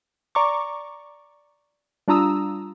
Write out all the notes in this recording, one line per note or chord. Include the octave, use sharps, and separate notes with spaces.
D5 A#5 C#6 D6
G3 D4 F4 A#5 D#6 E6